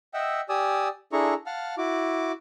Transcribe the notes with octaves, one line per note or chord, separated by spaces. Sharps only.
D#5 E5 F#5 G5 E6
G4 D5 G#5 D#6 E6
D4 E4 G#4 A4 A#5 C#6
F5 F#5 A5 F6
E4 F#4 D6